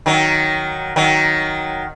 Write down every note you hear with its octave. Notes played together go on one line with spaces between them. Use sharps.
D#3 F#3
D#3 F#3